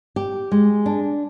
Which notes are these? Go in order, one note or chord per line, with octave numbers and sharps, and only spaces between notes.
G4
G#3
D4